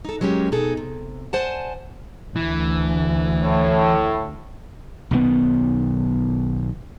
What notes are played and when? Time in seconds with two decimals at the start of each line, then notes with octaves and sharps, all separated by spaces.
0.05 D#4 A4
0.21 F#3 G#3 A#3 C#4 G4
0.52 B2 D#4 G#4 A4
0.77 C3
1.33 C5 D5 F#5 G#5 A5
2.36 D2 E3
3.41 A2
5.11 B1 D#3 B3